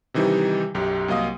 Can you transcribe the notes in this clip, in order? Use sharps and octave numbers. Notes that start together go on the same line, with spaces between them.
C3 D#3 E3 G3 D#4 G4
B1 F#2 G4
C2 F#3 A#3 D#5 F5 D#6